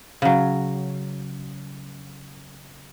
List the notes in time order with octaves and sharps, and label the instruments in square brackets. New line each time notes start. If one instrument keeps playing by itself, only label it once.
[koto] C#3 F#3